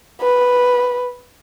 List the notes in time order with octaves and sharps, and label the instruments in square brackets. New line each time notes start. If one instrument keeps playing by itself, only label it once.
[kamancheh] B4